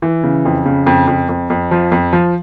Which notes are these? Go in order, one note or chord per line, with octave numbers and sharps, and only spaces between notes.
E3
C#3
F2
C#3
F2
F2
F2
F2
F3
F2
F3